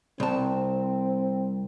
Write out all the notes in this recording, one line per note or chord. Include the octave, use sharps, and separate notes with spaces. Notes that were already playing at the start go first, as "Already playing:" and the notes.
C2 C4 A5